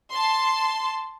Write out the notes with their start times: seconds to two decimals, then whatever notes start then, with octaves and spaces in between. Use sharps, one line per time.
0.12 A5 C6